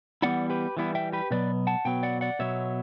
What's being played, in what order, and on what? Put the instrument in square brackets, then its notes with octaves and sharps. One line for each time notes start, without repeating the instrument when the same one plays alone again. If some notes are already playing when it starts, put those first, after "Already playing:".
[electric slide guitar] E3 G3 B3 E4 D5 F#5
G4 B4
E3 G3 B3 E4
E5 G5
G4 B4
B2 F#3 B3 B4 D5
F#5 A5
B2 F#3 B3 G5
D5 F#5
D5 F#5
B2 F#3 B3 C#5 E5